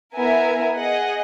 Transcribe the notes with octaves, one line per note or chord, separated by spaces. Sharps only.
B3 E4 A#4 E5 G#5
G#4 D#5 F#5